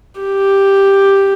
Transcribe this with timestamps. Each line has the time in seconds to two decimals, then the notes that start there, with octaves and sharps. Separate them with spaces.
0.20 G4